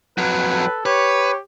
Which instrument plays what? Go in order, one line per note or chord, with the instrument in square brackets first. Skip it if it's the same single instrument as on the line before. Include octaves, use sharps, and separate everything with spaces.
[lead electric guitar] F2 F#3 [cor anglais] B4
[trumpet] A4
[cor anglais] G4 [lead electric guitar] B4 [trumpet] C#5